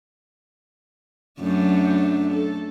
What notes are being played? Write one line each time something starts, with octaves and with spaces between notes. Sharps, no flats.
F#2 A3 D4
A4